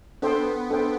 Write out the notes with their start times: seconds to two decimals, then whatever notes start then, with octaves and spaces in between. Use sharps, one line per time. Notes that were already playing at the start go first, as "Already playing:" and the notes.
0.22 B3 D4 A4 C5 G5
0.70 D4 A4 C5 G5